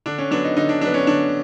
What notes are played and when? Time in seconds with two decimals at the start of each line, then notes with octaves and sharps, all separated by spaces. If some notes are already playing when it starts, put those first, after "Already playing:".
0.06 D3 D4
0.18 C#4
0.31 F#3 B3 D4
0.44 D#4
0.57 D3 D#4
0.69 D4
0.81 F#3 B3 D4
0.94 C#4
1.07 D3 D4